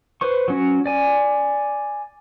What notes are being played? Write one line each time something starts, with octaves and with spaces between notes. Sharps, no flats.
B4 C5 C#6
F#3 C#4 F#4
D5 G#5